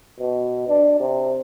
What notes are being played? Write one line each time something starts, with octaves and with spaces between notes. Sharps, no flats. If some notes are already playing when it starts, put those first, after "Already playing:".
B2
D4
C3